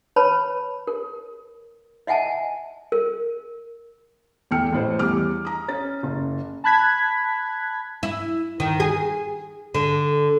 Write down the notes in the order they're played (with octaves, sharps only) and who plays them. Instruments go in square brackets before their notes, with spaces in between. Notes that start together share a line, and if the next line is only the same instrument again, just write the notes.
[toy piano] B4 C#5 A5 B5
A#4
D#5 E5 F#5 G#5 A5
A#4
[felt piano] E2 A3 G5 F6 C#7
A1 A2 C5
E2 G3 D6 F6
A#5 D#6
C#4 A6
F#1
[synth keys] A5 B5 F#6 G#6 B6
[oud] E4
D#3
G#4
D3